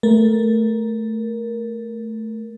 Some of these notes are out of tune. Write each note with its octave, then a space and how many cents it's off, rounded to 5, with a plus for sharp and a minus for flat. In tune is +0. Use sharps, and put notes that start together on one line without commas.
A3 +0 A#4 +10